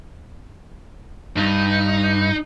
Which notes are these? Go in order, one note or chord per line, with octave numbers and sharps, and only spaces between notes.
G2 D#4